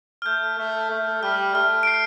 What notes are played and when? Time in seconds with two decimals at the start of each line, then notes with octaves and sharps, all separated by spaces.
0.22 F6
0.26 A3 G6
0.59 A3
0.91 A3
1.23 G3 F6
1.55 A3 F6
1.83 D7
1.87 C7